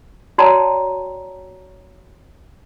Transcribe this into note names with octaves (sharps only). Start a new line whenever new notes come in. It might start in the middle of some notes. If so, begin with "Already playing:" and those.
F#4 C#5 D5 G5 A5 A#5